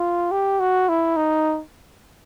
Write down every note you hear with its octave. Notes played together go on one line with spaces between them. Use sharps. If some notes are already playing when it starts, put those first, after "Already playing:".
Already playing: F4
G4
F#4
E4
D#4